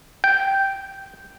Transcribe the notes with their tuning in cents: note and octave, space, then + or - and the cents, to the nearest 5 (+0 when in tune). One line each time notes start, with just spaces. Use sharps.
G5 -5